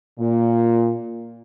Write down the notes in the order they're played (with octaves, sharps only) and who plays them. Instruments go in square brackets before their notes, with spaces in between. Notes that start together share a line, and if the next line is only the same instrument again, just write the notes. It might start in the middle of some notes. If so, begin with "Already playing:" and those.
[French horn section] A#2